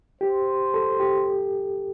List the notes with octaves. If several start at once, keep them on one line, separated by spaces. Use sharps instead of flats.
G4 C5
A4
G4